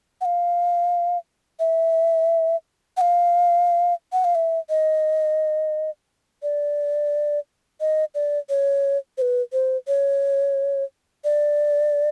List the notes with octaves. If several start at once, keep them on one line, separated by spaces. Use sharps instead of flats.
F#5
F5
E5
F#5
F5
F#5
F5
E5
D#5
D5
D#5
D5
C#5
C5
B4
C5
C#5
D5